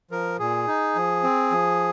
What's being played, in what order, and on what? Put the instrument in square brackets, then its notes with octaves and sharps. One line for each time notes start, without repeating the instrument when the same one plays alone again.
[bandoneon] F3 A#4
A#2 G#4
D#4
F3
C4
F3